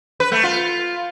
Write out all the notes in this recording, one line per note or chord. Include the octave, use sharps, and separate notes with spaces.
B4
A3
F4